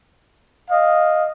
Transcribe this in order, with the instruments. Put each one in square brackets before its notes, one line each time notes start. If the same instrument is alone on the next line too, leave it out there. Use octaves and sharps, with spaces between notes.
[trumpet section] D#5 F5